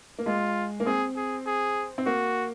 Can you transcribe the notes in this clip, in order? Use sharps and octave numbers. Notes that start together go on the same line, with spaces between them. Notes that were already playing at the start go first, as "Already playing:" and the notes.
A#3
G#3 F4
A#3
C4 G#4
G#4
G#4
C4
A#3 F#4